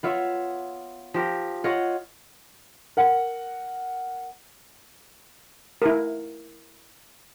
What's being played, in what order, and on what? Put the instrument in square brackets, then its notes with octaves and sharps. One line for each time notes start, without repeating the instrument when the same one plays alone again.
[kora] B3 F4 C#5 E5
F3 G4 A#4
F4 C#5 D#5 F#5
[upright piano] A#4 F#5
[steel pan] E4 A#4